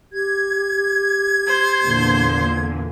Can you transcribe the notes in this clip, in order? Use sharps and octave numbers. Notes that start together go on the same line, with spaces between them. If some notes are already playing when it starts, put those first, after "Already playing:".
G4 G#6
C5 C6
E2 A#2 D3